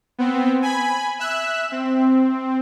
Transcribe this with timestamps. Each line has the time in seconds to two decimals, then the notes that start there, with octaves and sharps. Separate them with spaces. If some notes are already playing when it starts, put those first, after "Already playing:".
0.18 B3 C4
0.62 G#5 B5
1.19 E5 E6 F#6
1.72 C4